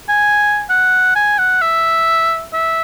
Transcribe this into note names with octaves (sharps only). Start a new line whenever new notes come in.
G#5
F#5
G#5
F#5
E5
E5